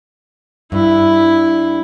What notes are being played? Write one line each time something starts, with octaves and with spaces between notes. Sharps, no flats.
G2 E4